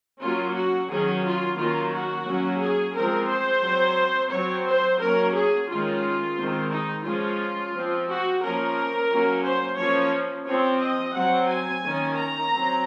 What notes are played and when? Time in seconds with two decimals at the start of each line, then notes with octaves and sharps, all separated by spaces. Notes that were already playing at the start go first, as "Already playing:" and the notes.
0.20 F#3 A#3 C#4 F4
0.54 F#4
0.89 D#3 F#3 C#4 G#4
1.23 F4
1.57 D#3 F#3 A#3 C#4 F4
1.92 F#4
2.25 F#3 A#3 C#4
2.59 G#4
2.94 F3 G#3 C4 A#4
3.29 C5
3.62 F#3 C4
4.31 F#3 C4 C#5
4.65 C5
4.99 F#3 A#3 C#4 A#4
5.34 G#4
5.68 D#3 G#3 C#4 F4
6.35 D#3 G#3 C4
6.70 D#4
7.04 F3 G#3 C#4 F4
7.73 F3 C4
8.07 F#4
8.41 F3 A#3 C#4 A#4
9.10 F#3 A#3 C#4
9.44 C5
9.78 F3 A#3 C#4 C#5
10.47 F3 C4 C#5
10.81 D#5
11.14 F#3 C4 F#5
11.50 G#5
11.83 D#3 A#3 C#4
12.18 A#5
12.52 F#3 C4